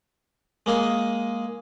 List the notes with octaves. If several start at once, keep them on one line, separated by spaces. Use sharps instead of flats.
G#3 A#3 G#4